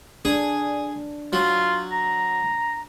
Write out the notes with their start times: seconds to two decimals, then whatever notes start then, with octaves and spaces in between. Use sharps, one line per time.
0.25 D4 G#4
1.33 F#3 F4
1.92 A#5